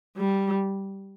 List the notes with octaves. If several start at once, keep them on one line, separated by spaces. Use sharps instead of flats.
G3